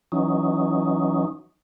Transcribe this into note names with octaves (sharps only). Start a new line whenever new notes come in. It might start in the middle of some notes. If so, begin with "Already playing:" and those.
E3 F#3 C#4 D#4